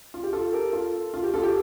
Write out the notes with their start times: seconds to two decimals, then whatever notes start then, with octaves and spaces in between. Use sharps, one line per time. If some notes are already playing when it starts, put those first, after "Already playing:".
0.14 F4
0.23 G4
0.33 F4 A4
0.53 G4 A#4
0.73 F4 A4
1.14 F4
1.23 G4
1.34 F4 A4
1.43 G4